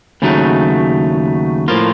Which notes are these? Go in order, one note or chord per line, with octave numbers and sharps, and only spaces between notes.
D#2 C#3 F#3 A3 D#4
A2 F3 A#3 F4